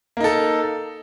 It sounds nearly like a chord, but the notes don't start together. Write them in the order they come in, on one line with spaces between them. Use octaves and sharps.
A#3 D#4 A4